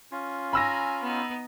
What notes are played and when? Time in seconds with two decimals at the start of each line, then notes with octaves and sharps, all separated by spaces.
0.12 C#4 F4
0.53 G#5 A#5 B5 E6 A#6
1.02 B3 D#4